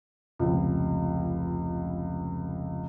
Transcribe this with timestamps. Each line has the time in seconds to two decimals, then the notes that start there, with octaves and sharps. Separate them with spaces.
0.39 F1 C#2